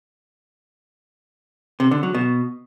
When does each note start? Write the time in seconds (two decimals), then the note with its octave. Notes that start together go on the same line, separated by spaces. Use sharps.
1.80 C3
1.91 D3
2.03 F#3
2.14 B2